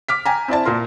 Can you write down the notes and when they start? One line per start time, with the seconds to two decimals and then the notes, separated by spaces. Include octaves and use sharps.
0.09 D6 F6 B6
0.25 G5 G#5 A#5
0.48 C4 E4 D5 A5
0.65 A#2 A#3 A#4 C6